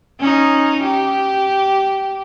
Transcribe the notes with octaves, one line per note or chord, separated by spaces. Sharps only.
C#4 D#4
G4